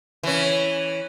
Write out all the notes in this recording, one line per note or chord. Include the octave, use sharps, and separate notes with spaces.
E3 C#4